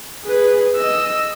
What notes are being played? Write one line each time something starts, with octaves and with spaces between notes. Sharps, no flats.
G#4 B4
D#5 E6